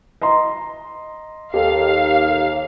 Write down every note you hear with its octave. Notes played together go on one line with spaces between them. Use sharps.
D#5 A#5 C6
D#2 G4 A4 F5